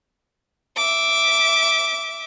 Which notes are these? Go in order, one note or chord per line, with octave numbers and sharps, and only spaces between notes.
E5 D6